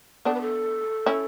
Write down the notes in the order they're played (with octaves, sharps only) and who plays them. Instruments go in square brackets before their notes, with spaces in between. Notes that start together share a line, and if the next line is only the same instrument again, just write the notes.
[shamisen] B3 D4 [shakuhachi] A4
[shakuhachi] B4
A4
[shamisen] C#4 E4